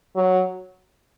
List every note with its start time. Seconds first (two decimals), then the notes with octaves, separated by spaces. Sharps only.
0.16 F#3